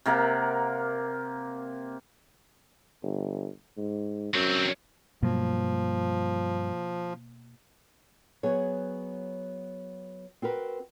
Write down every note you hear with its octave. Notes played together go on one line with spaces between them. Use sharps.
C3 A#3 A#4 F#5
G1
G#2
F#2 F#3 C4
G2 B2 F3 F#3 A#3
F#3 B3 G#4 C#5
C4 F#4 A#4 B4